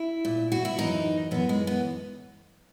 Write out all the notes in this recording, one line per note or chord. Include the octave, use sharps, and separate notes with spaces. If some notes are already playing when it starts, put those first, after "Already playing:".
Already playing: E4
A#2
F#4
E4
F#2 E3 D#4
F#2 E3 B3
G#3
B3